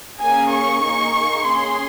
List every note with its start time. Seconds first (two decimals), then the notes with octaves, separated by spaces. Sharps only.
0.20 A#3 C#4 G#4 G#5
0.51 C#6
0.82 A#3 D#4 G#4
1.45 C#4 G#4 C6